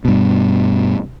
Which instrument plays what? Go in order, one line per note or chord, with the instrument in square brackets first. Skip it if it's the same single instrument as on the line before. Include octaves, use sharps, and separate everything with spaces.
[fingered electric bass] G2 B2